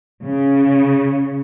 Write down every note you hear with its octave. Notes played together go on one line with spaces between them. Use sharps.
C#3